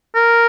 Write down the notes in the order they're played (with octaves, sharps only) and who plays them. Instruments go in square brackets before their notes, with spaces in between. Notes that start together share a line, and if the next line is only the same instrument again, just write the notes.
[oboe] A#4